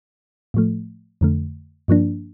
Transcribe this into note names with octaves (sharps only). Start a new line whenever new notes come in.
A2 F3 A3
F2 D3 A3
G2 F3 A#3 D4